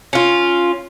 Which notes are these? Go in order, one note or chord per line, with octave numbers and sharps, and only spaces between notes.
C#4 F4